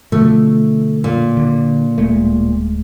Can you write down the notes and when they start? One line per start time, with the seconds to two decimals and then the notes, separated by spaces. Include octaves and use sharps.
0.12 B2 D3 F3 A3
1.04 A#2
1.37 D3
1.98 D1 G#3 A3